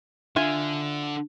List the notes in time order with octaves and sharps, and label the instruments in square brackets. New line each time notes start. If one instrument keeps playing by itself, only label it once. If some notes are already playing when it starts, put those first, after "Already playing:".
[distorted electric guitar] D3 [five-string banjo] F4 E5 G#5